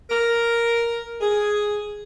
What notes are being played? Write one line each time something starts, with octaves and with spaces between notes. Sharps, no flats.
A#4
G#4